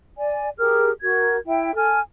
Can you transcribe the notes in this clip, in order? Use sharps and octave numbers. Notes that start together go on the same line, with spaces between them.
D5 G#5
G4 G#4 A#4 F6
F#4 A#4 G#6
E4 E5 G5
A4 G#5 F6